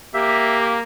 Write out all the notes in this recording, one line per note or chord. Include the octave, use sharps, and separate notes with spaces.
A#3 G4 E5